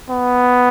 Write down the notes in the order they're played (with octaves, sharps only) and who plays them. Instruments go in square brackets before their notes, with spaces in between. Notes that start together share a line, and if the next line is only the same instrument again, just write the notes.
[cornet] B3